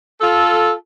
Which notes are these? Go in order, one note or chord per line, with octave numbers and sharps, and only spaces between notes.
F4 A4